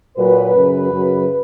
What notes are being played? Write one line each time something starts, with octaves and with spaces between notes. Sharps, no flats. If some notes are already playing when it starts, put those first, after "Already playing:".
A#2 F#3 B4
F#2 C#3 F#3
F#2 C#3 F#3